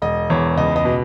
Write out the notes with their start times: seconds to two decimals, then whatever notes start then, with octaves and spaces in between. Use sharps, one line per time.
0.02 E1 D#5
0.30 E2 C#5
0.57 C#2 D#5
0.76 D#5
0.85 B2